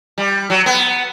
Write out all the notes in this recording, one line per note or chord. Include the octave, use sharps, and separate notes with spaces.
G3
F#3
B3